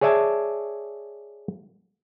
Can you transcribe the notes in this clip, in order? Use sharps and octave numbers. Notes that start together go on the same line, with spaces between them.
G#4 C#5 D5 E5 G#5 A5